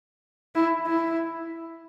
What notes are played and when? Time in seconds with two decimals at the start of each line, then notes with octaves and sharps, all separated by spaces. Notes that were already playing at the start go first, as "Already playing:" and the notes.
0.55 E4
0.86 E4